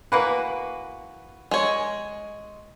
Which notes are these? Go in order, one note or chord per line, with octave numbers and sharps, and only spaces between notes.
E3 A#3 F#4 B4
G#3 C#5